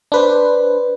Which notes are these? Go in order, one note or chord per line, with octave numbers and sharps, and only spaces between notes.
D4 B4 C5